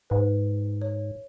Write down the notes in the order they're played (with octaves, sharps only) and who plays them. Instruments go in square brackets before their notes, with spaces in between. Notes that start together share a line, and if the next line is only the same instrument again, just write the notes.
[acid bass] G#2 [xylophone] B4
[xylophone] C#5